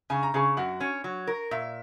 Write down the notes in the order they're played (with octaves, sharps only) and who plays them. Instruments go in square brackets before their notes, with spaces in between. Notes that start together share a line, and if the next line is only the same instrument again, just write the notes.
[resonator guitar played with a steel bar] C#3 [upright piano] G#5
[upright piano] A#5
[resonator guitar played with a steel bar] C#3 [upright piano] G#4 G#5
[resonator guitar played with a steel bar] F#2 [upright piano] F#4 F#5
[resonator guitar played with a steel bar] C#4
F#3
A#4
[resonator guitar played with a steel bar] A#2 [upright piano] E5